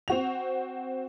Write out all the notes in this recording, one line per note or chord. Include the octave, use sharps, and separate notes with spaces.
C4 F#4 F7